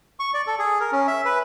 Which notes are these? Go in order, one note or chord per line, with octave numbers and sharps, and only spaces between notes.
C#6
D5
A4
G#4
A#4
C#4
E5
B4